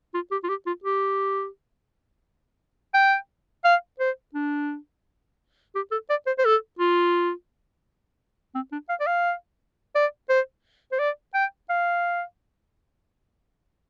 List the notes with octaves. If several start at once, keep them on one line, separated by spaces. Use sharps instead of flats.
F4
G4
F4
G4
F4
G4
G5
F5
C5
D4
G4
A4
D5
C5
C5
A4
F4
C4
D4
F5
D5
F5
D5
C5
C5
D5
G5
F5